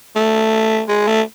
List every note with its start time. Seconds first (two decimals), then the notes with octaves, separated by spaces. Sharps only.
0.16 A3
0.89 G#3
1.07 A3